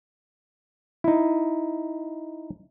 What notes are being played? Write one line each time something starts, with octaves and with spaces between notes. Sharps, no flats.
D#4 E4